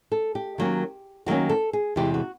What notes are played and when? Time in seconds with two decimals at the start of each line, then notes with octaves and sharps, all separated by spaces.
0.12 A4
0.35 G4
0.58 D#3 F#3 A#3 C#4
1.26 D#3 F#3 A#3 C#4 F#4
1.49 A4
1.73 G#4
1.96 E2 C3 E3 G#3 G4
2.14 F#4